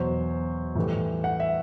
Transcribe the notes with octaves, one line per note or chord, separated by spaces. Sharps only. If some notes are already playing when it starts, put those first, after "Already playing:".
Already playing: E2 B2 F#3 C5
A2 E3 G3
F#5
E5